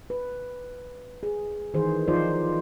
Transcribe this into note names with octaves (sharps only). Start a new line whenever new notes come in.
B4
G#4
D#3 E3 G#4 C5
E3 F3 D#4 F4 C5 D5